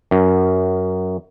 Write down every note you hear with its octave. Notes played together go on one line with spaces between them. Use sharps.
F#2